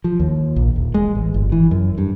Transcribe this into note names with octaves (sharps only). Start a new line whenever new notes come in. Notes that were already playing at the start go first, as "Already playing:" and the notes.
F3
D#2
A#1
D#1
G#3
A1
G1
E3
F#2
G2